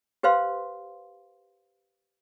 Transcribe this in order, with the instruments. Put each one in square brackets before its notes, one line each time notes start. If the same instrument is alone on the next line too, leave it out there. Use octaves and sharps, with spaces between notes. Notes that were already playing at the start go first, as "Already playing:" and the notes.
[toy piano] G4 B4 C5 F5 C6